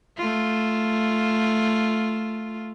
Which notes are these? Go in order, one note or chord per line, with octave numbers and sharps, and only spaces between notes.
A3 F4